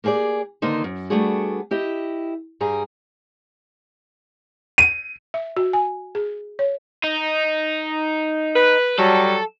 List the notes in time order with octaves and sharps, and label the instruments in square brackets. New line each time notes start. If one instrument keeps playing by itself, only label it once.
[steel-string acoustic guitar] A#3 G4 G#4 C5 D5
D3 D#3 A#3 B3 D#4 C5
F#2
G3 A3 B3 D4 F#4 G#4
E4 G4 D#5
G2 G3 G#4 A#5
[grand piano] D#7
[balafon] E5
F#4
G#5
G#4
C#5
[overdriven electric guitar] D#4
[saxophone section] B4
[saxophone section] F#3 G3 [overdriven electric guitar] A4